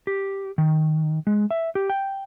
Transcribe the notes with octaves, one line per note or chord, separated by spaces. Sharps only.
G4
D#3
G#3
E5
G4
G5